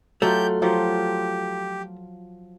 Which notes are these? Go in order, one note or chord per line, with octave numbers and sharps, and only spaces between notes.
F#3 A3 F4 G4 G6
F3 F#3 F4 G4